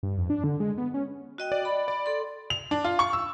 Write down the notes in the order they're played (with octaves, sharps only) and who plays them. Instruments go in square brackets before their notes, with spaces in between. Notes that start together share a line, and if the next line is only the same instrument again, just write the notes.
[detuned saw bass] G2
F2
D4
D3
G#3
B3
C#4
[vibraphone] F#4 D#5 G5
[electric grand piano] D5
[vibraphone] B5
[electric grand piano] D5
[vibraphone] A4 C6
[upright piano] F7
D4
F4
C#6
E6